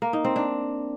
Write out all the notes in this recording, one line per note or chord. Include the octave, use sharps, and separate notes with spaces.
A#3
D#4
C4
D4